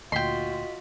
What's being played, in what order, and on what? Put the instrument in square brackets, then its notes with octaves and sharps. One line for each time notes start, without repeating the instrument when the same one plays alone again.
[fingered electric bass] D2 A#2 [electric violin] F4 F#4 [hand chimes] D#5 B6 [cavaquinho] G5 C6